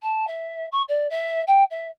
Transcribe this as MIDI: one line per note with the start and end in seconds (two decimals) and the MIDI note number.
0.02 0.27 81
0.27 0.67 76
0.72 0.82 85
0.88 1.07 74
1.10 1.42 76
1.47 1.64 79
1.71 1.88 76